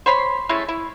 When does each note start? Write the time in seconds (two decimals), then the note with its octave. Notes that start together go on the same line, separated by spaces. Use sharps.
0.06 C5 C#5 B5 C6
0.49 G#3 A3 C#4 E4
0.68 E4